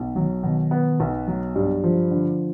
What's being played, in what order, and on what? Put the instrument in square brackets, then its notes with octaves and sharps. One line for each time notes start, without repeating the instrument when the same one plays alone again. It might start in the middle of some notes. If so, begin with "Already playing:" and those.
Already playing: [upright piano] B1
[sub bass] D#3 [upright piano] F#3
[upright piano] B2 [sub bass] D#3
[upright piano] B3
B1
F#3
G2
F3
D3